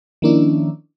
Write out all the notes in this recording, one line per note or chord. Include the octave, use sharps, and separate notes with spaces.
D#3 F3 A#3 C#4 D4 E4